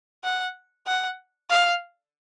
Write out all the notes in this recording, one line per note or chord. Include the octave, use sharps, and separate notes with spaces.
F#5
F#5
F5